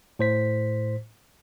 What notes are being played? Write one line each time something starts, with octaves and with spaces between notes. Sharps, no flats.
A2 C5 B6